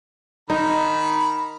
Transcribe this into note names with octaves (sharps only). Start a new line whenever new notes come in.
D#3 D#4 A#5 B5